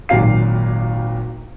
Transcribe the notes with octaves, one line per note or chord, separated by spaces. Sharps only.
G#1 A#2 F#3 G4 F5 C7